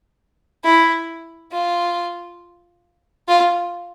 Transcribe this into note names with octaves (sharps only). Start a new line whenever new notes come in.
E4
F4
F4